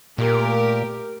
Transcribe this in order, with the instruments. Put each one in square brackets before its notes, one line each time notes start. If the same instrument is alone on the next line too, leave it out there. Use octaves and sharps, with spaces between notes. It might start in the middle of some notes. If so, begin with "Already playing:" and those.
[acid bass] A#2 [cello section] A3 G4 A#4